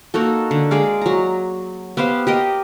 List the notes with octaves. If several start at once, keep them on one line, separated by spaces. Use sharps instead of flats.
A#3 D#4 F#4 A4
D3
G#3 G#4 D5 F5
F#3 A#5
B3 G4 C5 F5
G4 A#4 D#5